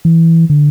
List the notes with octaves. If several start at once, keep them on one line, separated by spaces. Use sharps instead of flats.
E3
D3